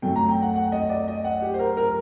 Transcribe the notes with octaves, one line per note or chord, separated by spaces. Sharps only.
F#2 F#3 A3 G5
A#5
G5
F#5
F#5
D#5
D5
D#5
F#5
G4
C5
A#4
A#4